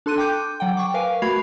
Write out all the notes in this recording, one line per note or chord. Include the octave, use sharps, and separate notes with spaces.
D4 A4 C6 F#6 D#7
G5 D6 G6
F#3 F#5 G5
G5 C#6 D6
A#4 B4 F5 G#5
A3 F#4 B5 G#6 C7 F7